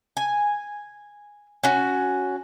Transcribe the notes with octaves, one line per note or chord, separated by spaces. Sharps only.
G#5
C#4 F#4